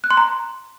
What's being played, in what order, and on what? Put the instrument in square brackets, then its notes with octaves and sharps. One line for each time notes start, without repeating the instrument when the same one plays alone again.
[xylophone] F#6
C6
A#5